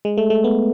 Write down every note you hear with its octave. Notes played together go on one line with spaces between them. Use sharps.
G#3
A3
A3
B3